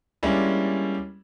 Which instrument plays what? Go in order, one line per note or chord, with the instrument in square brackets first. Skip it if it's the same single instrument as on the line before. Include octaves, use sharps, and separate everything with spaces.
[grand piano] G3 G#3 A#3 C#4 D4 E4